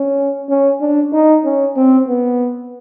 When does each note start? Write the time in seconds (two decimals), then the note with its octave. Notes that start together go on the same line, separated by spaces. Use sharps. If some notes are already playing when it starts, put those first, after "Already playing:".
Already playing: C#4
0.50 C#4
0.81 D4
1.13 D#4
1.45 C#4
1.76 C4
2.08 B3